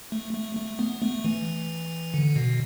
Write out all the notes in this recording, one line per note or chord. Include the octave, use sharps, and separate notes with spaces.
A3
A3
A3
B3
A3
E3
D3
B2